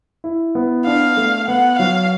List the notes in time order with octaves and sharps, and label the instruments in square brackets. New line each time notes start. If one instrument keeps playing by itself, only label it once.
[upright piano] E4
B3
[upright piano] D4 [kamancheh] F5
[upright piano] A3
[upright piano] B3 [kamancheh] F#5
[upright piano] F#3 [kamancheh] F5